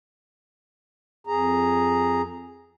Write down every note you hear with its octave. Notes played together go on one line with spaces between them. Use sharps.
F2 G#4 A#5